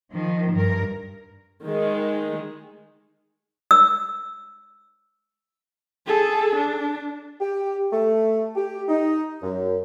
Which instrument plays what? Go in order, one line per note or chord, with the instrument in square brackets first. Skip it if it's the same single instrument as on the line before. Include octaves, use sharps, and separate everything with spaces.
[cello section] D#3 F3
G2 A#4
[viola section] D#3 G#3
[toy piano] E6
[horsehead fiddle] G#4 A4
D4
[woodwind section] G4
A3
G4
D#4
F#2